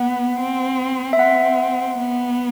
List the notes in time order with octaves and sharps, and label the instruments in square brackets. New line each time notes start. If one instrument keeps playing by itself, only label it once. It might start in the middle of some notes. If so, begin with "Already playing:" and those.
Already playing: [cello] B3 [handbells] F#5
[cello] C4
[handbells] E5
[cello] C4 [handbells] F#5
[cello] B3